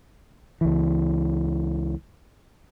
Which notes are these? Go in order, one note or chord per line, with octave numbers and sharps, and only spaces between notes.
C#2 E3